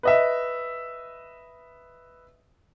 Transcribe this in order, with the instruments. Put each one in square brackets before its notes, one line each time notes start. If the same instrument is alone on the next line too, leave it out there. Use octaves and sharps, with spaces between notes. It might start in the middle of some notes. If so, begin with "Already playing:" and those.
[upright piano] B4 D#5 E5